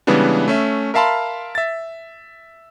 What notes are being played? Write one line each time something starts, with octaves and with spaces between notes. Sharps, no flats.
C#3 E3 G3 G#3 B3 D4
A3 C#4 E5
A#4 E5 F5 A5 B5 C6
E5 A6